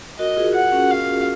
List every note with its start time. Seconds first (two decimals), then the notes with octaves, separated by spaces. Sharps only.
0.19 F#4 A#4 D#5
0.37 F4 G#4
0.55 F#5
0.72 C#4
0.91 F5